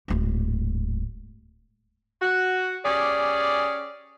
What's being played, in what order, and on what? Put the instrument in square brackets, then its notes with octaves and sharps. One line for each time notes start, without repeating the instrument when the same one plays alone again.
[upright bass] D1 G#2
[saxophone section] F#4
C#4 G4 G#4 D5